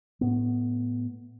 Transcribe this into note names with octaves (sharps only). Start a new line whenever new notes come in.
A2 B3